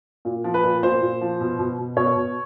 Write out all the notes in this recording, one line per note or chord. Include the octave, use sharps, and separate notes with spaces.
A#2
F3
B4
A#2
A#2 C5
A#2
F3
B2
B2
B2
B2 C#5
B2